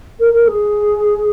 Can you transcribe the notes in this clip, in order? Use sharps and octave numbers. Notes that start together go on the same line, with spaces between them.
A#4
A#4
G#4